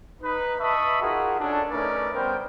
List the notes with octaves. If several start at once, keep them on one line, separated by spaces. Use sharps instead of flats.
D#4 B4
D#5 E5 A5 B5 C#6 D#6
D#4 F4 F#4 G#4 A#4
C#4 D4 A4
A3 C#4 D#4 A#4 B4 D5
G3 B3 C#4 A#4 C5 G5